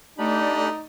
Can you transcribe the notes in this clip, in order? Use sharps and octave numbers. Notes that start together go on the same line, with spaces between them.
A3 D4 D#4 G4 D5 B5